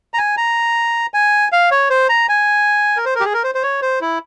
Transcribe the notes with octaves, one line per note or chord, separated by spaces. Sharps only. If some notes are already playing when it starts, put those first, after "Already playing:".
A#5
G#5
A#5
G#5
F5
C#5
C5
A#5
G#5
A#4
C5
A#4
G4
G#4
A#4
C5
C5
C#5
C5
E4